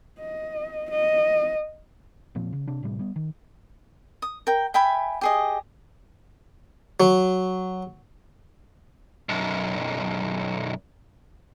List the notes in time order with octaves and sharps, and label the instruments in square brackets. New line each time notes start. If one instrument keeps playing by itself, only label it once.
[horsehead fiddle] D#5
D#5
[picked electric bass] E1 A#2 F3 C4
C#3
C3 D4
A1 A2 C3 G3
G3 B3
D#3
[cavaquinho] D#6
A#4 G5
E5 G5 G#5 B5
G4 G#4 D#5
[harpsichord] F#3
[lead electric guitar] B1 F#2